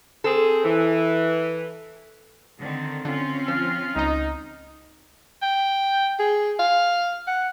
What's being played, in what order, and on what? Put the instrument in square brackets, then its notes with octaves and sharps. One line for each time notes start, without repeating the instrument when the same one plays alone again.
[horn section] C4 G#4 C5 [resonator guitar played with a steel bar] A4
[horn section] E3
[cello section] D3 D#3 C4
[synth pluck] D3 [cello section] C4 C#4 F4
[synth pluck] F3 [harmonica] F6
[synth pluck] C#2 D#5 [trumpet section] D#4
[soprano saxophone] G5
G#4
F5
F#5